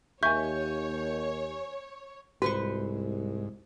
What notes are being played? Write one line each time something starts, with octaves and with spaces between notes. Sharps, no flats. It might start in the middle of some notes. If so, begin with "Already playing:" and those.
D#2 C#5 E5 G#5 C#6 G6
C2 G#2 F#4 B4 C5 C#6